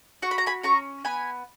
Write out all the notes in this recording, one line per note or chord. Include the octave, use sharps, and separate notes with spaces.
F#4 C#6
B5
A#5
G#5 B5
C#4 A#5 C#6
B3 G#5 B5